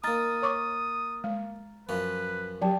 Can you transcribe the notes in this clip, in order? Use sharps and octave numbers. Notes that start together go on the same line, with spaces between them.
A#3 D#4 A#5 D#6 F6 A6
C#5 C#6 D6
G#3
F#2 F3 C#4 B4
F#3 G4 D5 G5 A5